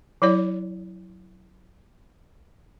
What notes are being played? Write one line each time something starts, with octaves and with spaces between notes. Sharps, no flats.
F#3 E4 C#5 D5